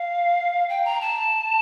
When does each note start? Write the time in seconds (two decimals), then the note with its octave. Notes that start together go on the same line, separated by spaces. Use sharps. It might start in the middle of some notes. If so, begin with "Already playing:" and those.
Already playing: F5
0.69 G5
0.85 A#5
1.01 A5